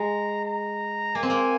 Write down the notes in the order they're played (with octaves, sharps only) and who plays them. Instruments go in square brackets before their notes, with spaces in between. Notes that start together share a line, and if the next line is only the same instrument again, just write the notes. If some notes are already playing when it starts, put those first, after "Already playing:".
Already playing: [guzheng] G#3 [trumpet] A#5
[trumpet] A#5
[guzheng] A#3 [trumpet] G#5
[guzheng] C4
A#3